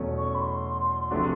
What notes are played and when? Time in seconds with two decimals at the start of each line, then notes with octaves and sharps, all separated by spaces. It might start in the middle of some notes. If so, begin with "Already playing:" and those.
Already playing: E2 B2 F#3 A3 C#4
0.17 C#6
0.34 B5
0.41 C6
1.11 C3 F3 A3 D4 F#4